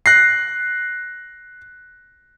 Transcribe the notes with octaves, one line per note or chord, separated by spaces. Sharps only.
F#6 A#6 C7